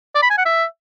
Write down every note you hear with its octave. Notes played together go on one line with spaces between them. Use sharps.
D5
B5
G#5
F#5
E5